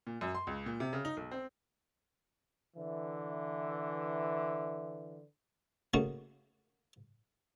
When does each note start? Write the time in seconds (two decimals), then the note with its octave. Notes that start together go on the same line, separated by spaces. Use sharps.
0.07 A#2
0.21 F#2
0.35 C6
0.47 C#2
0.66 A#2
0.80 C3
0.93 C#3
1.05 D#4
1.17 B1
1.31 C4
2.76 D3 E3
5.94 C#3 A3 A#3 D#4 F#4